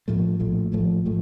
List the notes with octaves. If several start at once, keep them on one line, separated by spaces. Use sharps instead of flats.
A#1 A2 F3 A3
A#1 A2 F3 A3
A#1 A2 F3 A3
A2 F3 A3